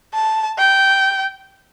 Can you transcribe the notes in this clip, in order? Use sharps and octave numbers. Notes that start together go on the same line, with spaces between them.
A5
G5